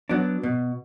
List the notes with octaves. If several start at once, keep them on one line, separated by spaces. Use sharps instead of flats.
F#3 B3 D4
B2